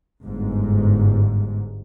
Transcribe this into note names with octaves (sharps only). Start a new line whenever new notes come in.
G1 G#2